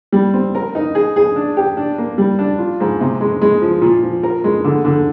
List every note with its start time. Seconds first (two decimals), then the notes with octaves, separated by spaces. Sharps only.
0.12 G3
0.34 C4
0.55 A#4
0.75 D#4
0.95 G#4
1.16 G#4
1.36 D4
1.57 G4
1.77 D4
1.98 A#3
2.18 G3
2.39 D4
2.59 F4
2.80 G#2
3.01 C3
3.21 G#3
3.42 G#3
3.62 F3
3.82 A#2
4.03 F3
4.23 A#4
4.44 G#3
4.64 D3
4.85 D3